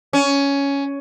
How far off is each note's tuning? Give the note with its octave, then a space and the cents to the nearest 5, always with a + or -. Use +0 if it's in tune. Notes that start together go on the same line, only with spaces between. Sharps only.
C#4 +10